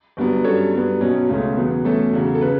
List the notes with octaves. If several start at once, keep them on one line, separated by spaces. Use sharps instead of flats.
G1 G2 F#3 B3
G2 F#3 C#4 A4 C#5
G2 F#3 B3
B1 B2 F#3 C#4
C#2 B2 A3 C#4
E2 C#3 F#3 B3
E2 B2 A3 C#4 A4
E2 C#3 F#3
A4
C#3 B4